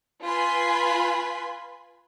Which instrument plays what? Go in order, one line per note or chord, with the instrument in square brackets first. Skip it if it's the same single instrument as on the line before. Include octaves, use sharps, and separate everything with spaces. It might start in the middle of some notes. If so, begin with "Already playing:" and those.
[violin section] F4 B4 G#5 B5 C6